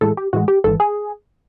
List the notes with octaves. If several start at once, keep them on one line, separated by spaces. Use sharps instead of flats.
A2 E3 G#3 A4
G4
A2 E3 G#3 F#4
G4
G#1 G#2 E3 A4
G#4